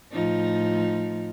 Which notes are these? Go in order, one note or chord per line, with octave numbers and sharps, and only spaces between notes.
A2 F3 D#4